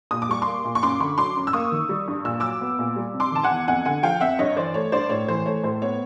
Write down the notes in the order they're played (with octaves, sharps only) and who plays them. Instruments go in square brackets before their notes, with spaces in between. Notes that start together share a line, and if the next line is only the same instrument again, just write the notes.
[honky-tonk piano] A#2 D#6
D6
G3 C#6
A#3 C6 D6
A#2
C#6
F#2 C6 D6
D3 B5 C#6
F#3 C6 D6
F#2
E6
A#3 C#6 D#6
D#3
G3
G2
A#2 E6
F#3 D6 E6
B3
A#2
G3
C3
C6 D6
D#3 A5
F#5 G#5
E2
F2 F#5 G#5
D3 F#5 G#5
F3 F5 G5
F2 E5 F#5
G2 C#5 D#5
E3 C5 D5
A3 C#5
G2 C5 D5
A2 C#5
E3 C5
A3 C#5
A2 C5
B3 C#5